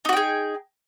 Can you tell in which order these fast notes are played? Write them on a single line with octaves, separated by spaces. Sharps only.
D#4 F#4 G5 G#4